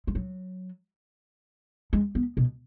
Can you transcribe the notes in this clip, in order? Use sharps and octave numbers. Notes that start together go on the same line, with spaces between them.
G#3
F#3
G#3
B3
B2